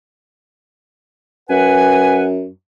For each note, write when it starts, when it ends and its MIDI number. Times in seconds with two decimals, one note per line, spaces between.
1.49 2.48 42
1.49 2.25 71
1.49 2.25 78
1.49 2.25 80